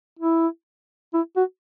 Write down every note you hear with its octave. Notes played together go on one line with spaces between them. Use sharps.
E4
E4
F#4